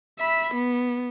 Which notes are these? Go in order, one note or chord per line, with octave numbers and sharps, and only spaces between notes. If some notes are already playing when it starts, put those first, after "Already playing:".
E5 B5
B3